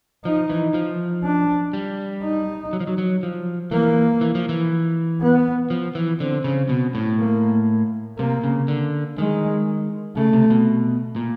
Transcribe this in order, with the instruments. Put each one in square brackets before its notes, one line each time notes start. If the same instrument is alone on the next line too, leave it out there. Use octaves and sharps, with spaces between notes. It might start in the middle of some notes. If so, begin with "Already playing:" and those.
[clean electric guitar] F3 [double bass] D#4
[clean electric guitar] E3
F3
[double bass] D4
[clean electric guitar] G3
[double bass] D#4
[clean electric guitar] F#3
F3
F#3
F#3
F3
[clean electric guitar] E3 [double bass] A#3
[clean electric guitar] E3
F3
E3
[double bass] B3
[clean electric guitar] F3
E3
[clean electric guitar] D3 [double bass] C4
[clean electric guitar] C#3
B2
A2
[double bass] A#3
[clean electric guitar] C3 [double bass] A#3
[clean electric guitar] C#3
D3
[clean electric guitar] D#3 [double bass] G#3
[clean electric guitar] C#3 [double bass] A3
[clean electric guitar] C3
B2
A#2